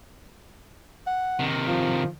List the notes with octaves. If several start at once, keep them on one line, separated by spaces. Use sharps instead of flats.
F#5
C3 D#3
F3